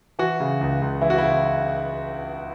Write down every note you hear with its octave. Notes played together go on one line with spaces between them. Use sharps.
E3 F#4
C#3
C#2
C#2
E3 E4
F#4
C#3 E4